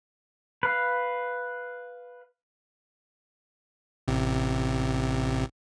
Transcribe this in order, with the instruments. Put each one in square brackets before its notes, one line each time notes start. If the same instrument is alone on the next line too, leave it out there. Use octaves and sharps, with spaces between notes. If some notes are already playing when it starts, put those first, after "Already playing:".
[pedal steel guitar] B4 F5
[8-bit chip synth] A1 C3